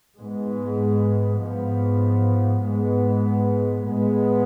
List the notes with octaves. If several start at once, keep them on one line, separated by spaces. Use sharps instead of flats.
G#2 G#3 B3
G#2 F3 B3
G#2 G#3 B3
A2 G#3 B3